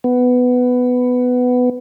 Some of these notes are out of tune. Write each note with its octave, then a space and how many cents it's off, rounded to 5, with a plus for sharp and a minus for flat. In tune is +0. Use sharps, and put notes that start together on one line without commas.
B3 +10